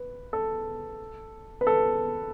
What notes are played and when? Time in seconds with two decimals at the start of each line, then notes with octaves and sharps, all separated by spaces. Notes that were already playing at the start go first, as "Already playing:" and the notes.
Already playing: B4
0.33 A4
1.61 B4
1.67 A4